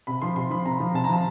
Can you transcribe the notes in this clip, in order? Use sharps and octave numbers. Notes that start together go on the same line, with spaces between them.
C3 B5
F3 C6
C3 C6
F3 B5
C3 A#5
F3
C3 A5
A#5
F3 A5